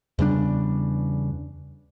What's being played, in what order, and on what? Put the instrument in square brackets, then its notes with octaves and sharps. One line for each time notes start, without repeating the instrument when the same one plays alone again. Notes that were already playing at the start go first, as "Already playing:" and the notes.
[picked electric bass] E2 C#3 G3 D4